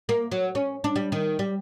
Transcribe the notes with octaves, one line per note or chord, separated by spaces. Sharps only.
A#3
F#3
C#4
D4
G3
D#3
G3